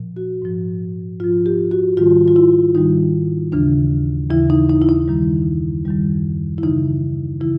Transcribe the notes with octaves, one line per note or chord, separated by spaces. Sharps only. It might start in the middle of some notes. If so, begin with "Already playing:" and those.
Already playing: A#2 F3
F#4
G#2 F3
G#2 F3 F4
G4
F#4
G#2 D#3 G3 F4
F4
E4
G#2 D#3 G3 D#4
D#2 C#3 E3 D4
D#2 C#3 E3 E4
D#4
D#4
E4
D#4
F#2 D#3 G3
F#2 D#3 G3
E4
F#2 C#3 E3 D#4
C#3 E3 E4